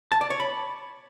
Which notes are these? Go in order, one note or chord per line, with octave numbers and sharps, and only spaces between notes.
A5
D5
C#5
B5